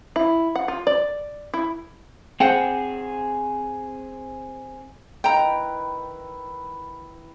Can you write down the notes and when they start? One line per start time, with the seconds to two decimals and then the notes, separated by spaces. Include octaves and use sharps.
0.16 E4
0.55 F#5
0.68 F4
0.87 D5
1.54 E4
2.40 C4 G#4 C5 F#5 G5
5.24 D#3 E4 B4 G5 A#5